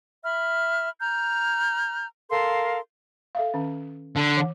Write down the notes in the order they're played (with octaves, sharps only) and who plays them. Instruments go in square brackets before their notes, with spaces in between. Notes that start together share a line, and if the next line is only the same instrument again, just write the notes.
[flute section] E5 B5 F6
A#5 F6 G6
A4 A#4 F5 C6
[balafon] A4 E5 F5
D#3 C#4
[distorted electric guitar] D3
[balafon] E3